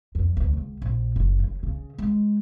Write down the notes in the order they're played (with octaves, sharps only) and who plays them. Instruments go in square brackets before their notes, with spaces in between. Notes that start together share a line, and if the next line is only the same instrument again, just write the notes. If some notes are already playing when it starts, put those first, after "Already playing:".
[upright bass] F2
D2
C#2
A#1
F#1
F#2
C#3
G#3